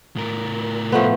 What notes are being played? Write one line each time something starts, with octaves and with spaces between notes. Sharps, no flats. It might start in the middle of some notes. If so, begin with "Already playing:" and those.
A2 A#4
F3 A3 B3